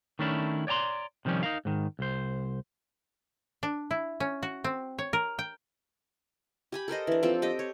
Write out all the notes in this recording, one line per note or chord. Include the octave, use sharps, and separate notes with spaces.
D#3 A3 C#4 D4 E4
C#5 D5 G5 A#5 C6
C3 D#3 F3 G3 C#4
D#4 A#4 F5
G#2 D#3
C2 C5
D4
E4
C#4
F#4
C4
C#5
A#4
G5
G4 G#5 B5
A4 A#4 C5 D#5
E3 D4
F3 C4 A4
G4 D#5 G5
C#5